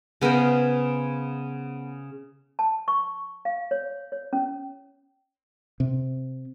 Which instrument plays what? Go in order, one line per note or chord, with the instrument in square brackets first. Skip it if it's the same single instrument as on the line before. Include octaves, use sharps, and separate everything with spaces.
[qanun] C#3 B3 A#4 C5
[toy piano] A5
C#6
F5
C#5
C#5
C#4
[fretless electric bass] C3